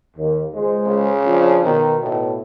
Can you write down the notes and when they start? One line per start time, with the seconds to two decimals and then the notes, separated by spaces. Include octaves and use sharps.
0.17 D#2
0.55 C#2 G#3 C5
0.86 C#3
1.25 F3 C#4 D4
1.64 B2 D#3
2.03 A2